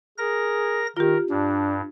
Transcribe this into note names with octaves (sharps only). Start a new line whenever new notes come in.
G#4 A#4 A#6
D#3 F4 G4 A#4
G2 D4